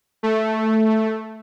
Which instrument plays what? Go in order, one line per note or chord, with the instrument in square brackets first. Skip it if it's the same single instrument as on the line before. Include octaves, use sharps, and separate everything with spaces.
[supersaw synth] A3